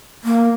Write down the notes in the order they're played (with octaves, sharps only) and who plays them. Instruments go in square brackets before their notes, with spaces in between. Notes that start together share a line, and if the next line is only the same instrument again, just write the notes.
[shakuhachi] A#3